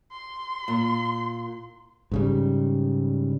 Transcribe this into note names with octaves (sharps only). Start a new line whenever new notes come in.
C6
A#2
G#2 C#3 G3